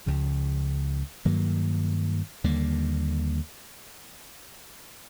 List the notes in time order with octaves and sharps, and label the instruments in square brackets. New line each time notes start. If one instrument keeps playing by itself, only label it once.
[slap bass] C#2 C#3 F3
G2 D#3 F#3 A#3
D#2 D3 G3 A#3